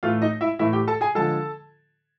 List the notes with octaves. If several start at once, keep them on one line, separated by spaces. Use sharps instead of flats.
A2 E3 A3 F4 F5
D#4 D#5
E4 E5
A2 E3 A3 E4 E5
G4 G5
A4 A5
G#4 G#5
D3 F3 G#3 A4 A5